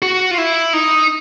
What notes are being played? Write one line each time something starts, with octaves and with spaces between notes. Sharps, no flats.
F#4
F4
E4
D#4